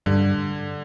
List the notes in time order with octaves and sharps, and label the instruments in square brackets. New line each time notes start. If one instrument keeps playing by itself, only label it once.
[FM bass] G2 [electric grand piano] D3